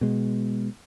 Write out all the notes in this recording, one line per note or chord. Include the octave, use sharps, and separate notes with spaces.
B2 G#3